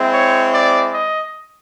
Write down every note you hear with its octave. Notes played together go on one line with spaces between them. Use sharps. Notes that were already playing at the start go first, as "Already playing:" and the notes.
Already playing: G#3 C4 E4
C#5
D5
D#5